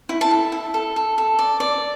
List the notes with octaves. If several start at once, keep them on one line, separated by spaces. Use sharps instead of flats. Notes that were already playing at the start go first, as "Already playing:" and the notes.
E4
A5
A4
E4
A4
A4
A4
D5
D5